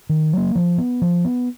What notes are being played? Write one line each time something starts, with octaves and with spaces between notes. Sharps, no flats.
D#3
F#3 A#3
F3
B3
F3
B3